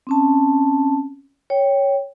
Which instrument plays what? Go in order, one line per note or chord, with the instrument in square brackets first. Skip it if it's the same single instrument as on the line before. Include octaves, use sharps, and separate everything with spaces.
[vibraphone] C4 C#4 A5
C#5 G5